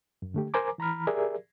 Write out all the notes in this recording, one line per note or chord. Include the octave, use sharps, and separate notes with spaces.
F#2
D3 A3 G4
A#4 C5 G#5 A#5 D6
E3 A#5 B5 F6
G4 G#4 A#4 D5 E5